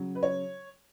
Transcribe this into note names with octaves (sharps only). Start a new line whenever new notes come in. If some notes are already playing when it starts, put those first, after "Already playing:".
Already playing: C#3 F#3
B4
C#5